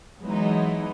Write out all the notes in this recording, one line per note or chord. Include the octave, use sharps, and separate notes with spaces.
E3 F#3 G#3 B3 D#4 E4